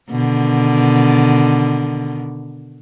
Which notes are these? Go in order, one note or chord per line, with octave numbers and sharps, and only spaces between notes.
B2 D3 D#3